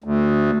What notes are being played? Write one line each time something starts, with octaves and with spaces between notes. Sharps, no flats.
D2